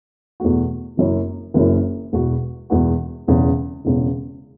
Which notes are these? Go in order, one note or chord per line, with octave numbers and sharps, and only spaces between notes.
E2 B2 A3 F#4
F#1 F#2 F#3 C#4 E4
F#1 F#2 F#3 C#4 E4
E1 E2 B2 B3 F#4
E1 E2 B2 B3 F#4
E1 E2 C#3
E1 E2 C#3